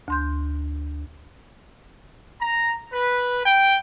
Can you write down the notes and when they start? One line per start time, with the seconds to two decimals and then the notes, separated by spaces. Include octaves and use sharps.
0.08 D2 C6 G6
2.41 A#5
2.93 B4
3.46 G5